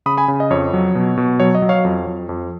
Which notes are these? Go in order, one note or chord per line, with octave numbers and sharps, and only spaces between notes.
C#3 B5 D#6
G#5 B5
C#3
D#5
F2 C#5
F#3
B2
B2
F#3 C#5
D#5
F#3
C#5 F5
F2
F2
F2